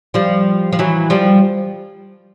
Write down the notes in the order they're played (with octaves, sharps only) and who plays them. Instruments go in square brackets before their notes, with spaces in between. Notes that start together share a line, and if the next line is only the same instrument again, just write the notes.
[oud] F3 G3
F3
E3 F#3
F3 G3